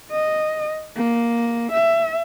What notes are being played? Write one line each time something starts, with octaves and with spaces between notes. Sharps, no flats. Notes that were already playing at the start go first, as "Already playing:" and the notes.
D#5
A#3
E5